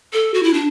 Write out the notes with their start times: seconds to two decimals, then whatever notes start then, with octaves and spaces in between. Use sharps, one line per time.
0.13 A4
0.34 F#4
0.43 E4
0.54 D4